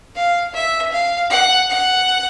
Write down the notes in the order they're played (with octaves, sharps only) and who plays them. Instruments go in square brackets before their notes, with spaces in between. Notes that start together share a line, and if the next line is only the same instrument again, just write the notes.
[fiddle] F5
E5
F5
F#5
F#5